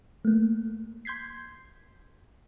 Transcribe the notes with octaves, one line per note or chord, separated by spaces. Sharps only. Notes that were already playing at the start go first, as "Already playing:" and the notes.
A3 A#3
C6 G6 G#6 B6 C7